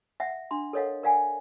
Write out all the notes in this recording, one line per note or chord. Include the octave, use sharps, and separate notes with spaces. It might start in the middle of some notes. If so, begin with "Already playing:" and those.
E5 F#5
D4 C6
A4 A#4 C#5 D#5 F5 F#5
A#4 D5 F5 F#5 G#5